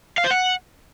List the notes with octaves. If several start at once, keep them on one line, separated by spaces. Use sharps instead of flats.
F5
C5
F#5